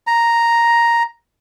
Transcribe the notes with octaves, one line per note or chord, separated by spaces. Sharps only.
A#5